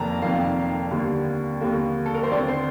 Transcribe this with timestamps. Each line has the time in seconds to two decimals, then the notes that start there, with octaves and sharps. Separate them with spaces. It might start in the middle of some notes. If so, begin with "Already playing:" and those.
Already playing: F1 F2 D#3 A#3 A5 A#5
0.22 F1 F2 D#3 A#3 F5
0.91 D#2 D3 G3 A#3
1.61 D#2 D3 G3 A#3
2.06 A4
2.14 A#4
2.23 C5
2.31 D#2 D3 A3 C4 D5
2.48 C5